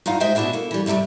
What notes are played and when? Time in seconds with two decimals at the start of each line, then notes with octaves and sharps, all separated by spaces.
0.06 G2 D#4 F4 F5 F#5
0.20 G#3 C5 D#5 E5 G5
0.35 B2 D4 E4 F#4 G#4
0.53 A#3 A4
0.71 E3 G3
0.86 G2 C3 F#3 G3 A3